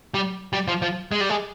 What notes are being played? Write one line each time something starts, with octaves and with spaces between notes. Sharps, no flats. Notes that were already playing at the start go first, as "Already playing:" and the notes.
G3
G3
F3
F3
G#3
G3
G#3